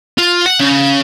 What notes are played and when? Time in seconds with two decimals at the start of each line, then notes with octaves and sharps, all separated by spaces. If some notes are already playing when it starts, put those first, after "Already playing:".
0.18 F4
0.45 F#5
0.60 C#3